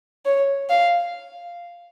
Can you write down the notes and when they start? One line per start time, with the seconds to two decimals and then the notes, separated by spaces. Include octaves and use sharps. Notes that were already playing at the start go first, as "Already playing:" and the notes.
0.25 C#5
0.69 F5